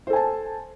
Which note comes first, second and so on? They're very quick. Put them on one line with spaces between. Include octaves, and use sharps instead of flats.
C5 A4 G#5 A5